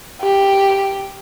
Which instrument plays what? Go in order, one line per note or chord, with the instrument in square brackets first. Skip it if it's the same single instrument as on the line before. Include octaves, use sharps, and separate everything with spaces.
[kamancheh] G4